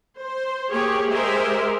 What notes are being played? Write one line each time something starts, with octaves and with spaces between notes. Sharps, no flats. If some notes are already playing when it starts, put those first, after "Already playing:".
C5
A#3 G4 G#4 C#5
G#3 G4 G#4 A#4 C5 E5